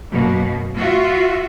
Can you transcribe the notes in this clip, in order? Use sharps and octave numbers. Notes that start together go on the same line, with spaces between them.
F#2 B2 A#3
F4 F#4 E5